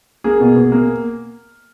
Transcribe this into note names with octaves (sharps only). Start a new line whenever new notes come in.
A#3 G#4
B2
B2
A#3